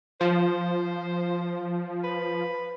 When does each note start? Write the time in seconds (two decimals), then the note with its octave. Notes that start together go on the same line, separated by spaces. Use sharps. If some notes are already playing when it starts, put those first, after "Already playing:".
0.21 F3 C5
2.04 B4